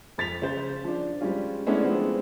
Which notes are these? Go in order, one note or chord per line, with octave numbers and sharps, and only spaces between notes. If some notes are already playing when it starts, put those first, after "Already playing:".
F2 A6 B6 F7
C#3 C5
F3 D4
G3 G#3 C#4 F4
G#3 A3 B3 C#4 D4 E4
F3 G#3 B3 C4